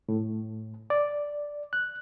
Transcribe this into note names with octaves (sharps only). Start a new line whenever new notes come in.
A2
D5
F#6